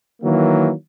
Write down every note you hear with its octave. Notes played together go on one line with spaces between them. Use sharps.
D#3 E3 F#3 A#3